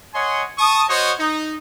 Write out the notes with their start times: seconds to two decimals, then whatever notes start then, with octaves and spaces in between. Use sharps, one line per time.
0.14 C#5 D#5 F#5 G#5 C6
0.58 A5 C#6 D#6
0.88 F#4 C5 C#5 D#5
1.19 D#4